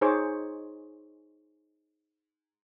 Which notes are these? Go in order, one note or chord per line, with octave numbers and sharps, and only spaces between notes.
D#4 G#4 C5 C#5 D6